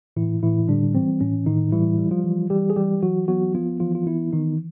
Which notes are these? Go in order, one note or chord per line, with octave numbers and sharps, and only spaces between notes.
A2 E3 E4
A2 E3 E4
D3 G3 D4
E3 C4
A2 C#4
A2 D#3 D#4
E3 G3 E4
G3
F3 F4
E3
E3 G3 G4
G#4
E3 G3 G4
E3 F#3 F#4
F#3 B3 F#4
F3 B3 F4
E3 F3 F4
F4
E3 B3 E4
D#3 E3 D#4